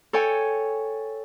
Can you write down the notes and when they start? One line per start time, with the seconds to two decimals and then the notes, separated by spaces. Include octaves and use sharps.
0.13 A4 C#5 G5 G#5